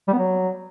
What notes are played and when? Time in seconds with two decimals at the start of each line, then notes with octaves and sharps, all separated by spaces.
0.08 G3
0.13 B3
0.18 F#3